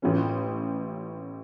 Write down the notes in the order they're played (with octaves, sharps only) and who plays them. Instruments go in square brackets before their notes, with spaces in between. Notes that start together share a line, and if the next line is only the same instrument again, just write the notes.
[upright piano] A1 A2 A3 C#4 F4